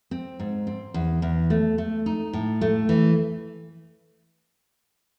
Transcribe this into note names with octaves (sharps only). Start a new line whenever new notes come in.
C4
G#2
C4
E2
E2
A3
A3
D#4
A2
A3
E3